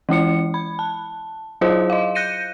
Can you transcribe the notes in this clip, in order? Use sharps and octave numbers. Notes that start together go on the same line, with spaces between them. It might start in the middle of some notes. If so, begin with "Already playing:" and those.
E3 G#3 E4 C#7
B5
A5
F#3 E4 F4 G#4 C5 D#5
D#5 F5
F#6 G6 A#6 C#7 D#7